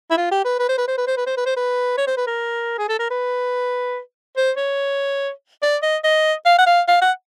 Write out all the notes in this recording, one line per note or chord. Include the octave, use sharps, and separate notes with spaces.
E4
F4
G4
B4
B4
C5
B4
C5
B4
C5
B4
C5
B4
C5
B4
C#5
C5
B4
A#4
G#4
A4
A#4
B4
C5
C#5
D5
D#5
D#5
F5
F#5
F5
F5
F#5